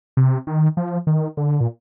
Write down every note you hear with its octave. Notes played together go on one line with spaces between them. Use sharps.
C3
D#3
F3
D#3
D3
A#2